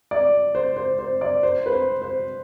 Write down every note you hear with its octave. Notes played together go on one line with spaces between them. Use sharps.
D5
C5
C5
C5
D5
C5
B4
C5
C5